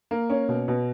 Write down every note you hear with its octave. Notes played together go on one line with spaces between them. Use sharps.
A#3
C#4
B2
B2